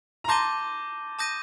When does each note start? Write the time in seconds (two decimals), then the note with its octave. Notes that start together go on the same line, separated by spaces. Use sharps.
0.24 A#5
0.28 A5 C6 D6 G6 A#6 D#7 G7
1.19 A5 D#6 G6 A#6 D#7